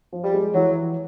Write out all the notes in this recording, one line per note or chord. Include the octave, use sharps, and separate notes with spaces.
F3
G3
G#3
E3 F#3